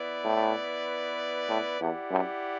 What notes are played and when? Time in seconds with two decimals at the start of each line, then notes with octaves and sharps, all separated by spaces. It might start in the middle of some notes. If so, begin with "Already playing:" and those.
Already playing: B3 E4 B4 D5
0.24 A2
1.49 A2
1.80 E2 E4 G4 D5 F#5
2.11 F#2